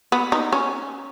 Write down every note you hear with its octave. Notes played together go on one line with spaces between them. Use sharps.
B3
D#4
C#4